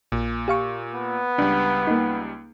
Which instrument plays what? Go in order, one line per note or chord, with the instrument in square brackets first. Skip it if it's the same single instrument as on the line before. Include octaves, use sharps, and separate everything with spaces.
[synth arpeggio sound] A#1 [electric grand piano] A#2
[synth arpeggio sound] G4 F5 C#6
[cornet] B3
[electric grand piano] C#2 G3 [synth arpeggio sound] D4
[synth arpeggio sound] A#3 D#4